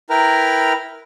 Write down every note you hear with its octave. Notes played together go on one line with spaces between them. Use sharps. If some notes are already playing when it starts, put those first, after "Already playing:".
E4 A#4 B4 G5 A#5 F6